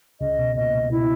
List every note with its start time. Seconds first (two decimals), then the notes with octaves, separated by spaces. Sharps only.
0.20 C#2 C#3 D#5
0.38 B2
0.56 A#2 D#5
0.74 B2
0.91 B2 E4